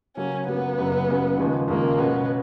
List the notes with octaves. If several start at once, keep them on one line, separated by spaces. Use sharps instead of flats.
C#3 F#3 A#3 C#4
C#3 F#3 A#3 B3
F#1 F#2 C#3 F#3
F#1 F#2 C#3 F#3
D#2 C#3 F3 G#3
D#2 C#3 F3 G#3 A#3
B2 A#3 B3 C#4